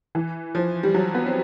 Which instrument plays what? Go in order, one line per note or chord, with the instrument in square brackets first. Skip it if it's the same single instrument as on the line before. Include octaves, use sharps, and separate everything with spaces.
[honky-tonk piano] E3
F3
G3
F#3
B3
C4